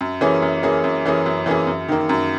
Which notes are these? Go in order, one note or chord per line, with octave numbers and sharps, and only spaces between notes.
F#2
E3 A#3 C#4 G#4
F#2
E3 A#3 C#4 G#4
F#2
E3 A#3 C#4 G#4
F#2
E3 A#3 C#4 G#4
F#2
D#3 A#3
F#2